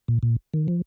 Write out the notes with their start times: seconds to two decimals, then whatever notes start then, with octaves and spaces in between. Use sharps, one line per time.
0.08 A#2
0.23 A#2
0.54 D#3
0.68 F3